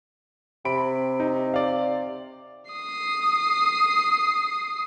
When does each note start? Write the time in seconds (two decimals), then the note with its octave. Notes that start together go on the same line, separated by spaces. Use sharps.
0.65 C3 B5 D7
1.20 D#4
1.54 D5 F5
2.71 D#6 C7